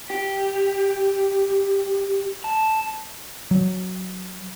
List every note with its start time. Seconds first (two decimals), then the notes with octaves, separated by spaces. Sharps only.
0.10 G4
2.44 A5
3.51 F#3